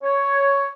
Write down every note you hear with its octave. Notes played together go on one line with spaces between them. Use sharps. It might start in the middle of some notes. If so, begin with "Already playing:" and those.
C#5